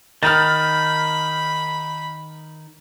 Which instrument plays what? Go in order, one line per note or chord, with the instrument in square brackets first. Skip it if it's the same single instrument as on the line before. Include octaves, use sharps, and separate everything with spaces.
[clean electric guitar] D#3 [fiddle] B5 [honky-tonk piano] F6 A6